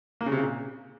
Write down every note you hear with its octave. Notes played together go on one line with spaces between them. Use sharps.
A#3
C#3
C3
C#3
A#2